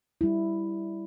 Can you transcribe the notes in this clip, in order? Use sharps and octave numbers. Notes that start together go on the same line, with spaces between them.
G3 E4